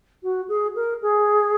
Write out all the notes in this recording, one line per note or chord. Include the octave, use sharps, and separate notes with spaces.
F#4
G#4
A#4
G#4